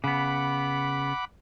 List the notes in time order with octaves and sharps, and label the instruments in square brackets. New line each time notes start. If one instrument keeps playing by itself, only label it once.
[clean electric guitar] C#3 B3 [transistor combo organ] F#5 B5 D6